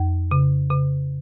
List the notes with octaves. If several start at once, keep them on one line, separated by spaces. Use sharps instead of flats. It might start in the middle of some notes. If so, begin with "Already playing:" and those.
Already playing: F2
C#3
C#3